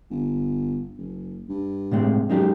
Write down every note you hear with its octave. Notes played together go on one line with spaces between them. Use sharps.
G1
F#1
G2
A2 C3 G#3
F#2 G#3 D#4 G4